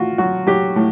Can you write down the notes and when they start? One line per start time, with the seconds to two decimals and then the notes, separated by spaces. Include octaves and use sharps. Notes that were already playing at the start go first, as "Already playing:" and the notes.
Already playing: A2 F4 F#4
0.18 F#3 F#4
0.47 F#3 G4
0.76 A2